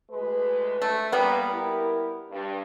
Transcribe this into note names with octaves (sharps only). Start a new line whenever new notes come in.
D2 G#3 B4
A3
G3 A#3 B3 B4
E4 G4 A#4
G2